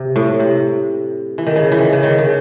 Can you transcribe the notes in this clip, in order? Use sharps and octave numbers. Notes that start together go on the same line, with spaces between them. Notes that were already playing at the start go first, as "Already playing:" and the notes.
Already playing: C3
A2
C3
E3
D#3
C#3
E3
D#3
C#3
D#3
C#3